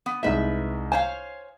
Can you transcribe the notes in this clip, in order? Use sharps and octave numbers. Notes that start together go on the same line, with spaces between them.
B3
C2 G#3 D#4 B4 E5
C5 C#5 F5 G#5